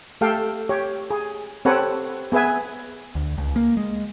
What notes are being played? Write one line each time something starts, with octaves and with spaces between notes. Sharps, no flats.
A3 G4 A4 F5 G5
G4 C#5
G#4
C4 G4 A4 B4 C#5 F#5
B3 G#4 B4 E5 G#5
D2
C#2
A#3
G#3